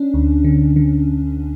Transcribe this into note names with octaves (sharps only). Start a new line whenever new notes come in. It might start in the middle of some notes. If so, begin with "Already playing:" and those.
Already playing: C#4 D4
D2
D3
D3